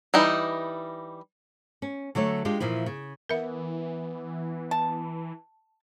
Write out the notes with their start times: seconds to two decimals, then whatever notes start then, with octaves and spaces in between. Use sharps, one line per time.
0.14 E3 G3 D#4
1.82 C#4
2.15 D3 F#3 A3 C#5
2.45 G#3 D4 F4 G4
2.60 A#2 E3 F3 E4
2.86 C#3
3.29 E3 B3 A#4 E5
4.71 A5